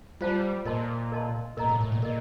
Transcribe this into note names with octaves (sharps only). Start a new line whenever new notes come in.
G3 F4 C5 F5 A5
A#2 A#4 D#5 A5 C6
A#4 D#5 A5 C6
A#2 A#4 D#5 A#5
A2
A2
A#2
A#2 A#4 D#5